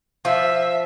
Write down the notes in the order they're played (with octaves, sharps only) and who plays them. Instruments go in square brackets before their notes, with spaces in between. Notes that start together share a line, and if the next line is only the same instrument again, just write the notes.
[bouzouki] F3 [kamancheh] E5